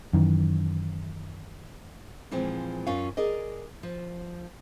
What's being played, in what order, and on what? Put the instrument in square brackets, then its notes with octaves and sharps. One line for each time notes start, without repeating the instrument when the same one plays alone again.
[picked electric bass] F#2 D#3 E3
[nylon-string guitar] A#2 E3 F3 G#3 C4
F#2 C#4 F4 F5
G#4 A#4 D5 D#5
F3